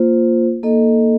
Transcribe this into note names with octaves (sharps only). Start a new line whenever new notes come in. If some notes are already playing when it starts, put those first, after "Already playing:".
Already playing: A#3 F4 C5
A#3 D#4 A4 D#5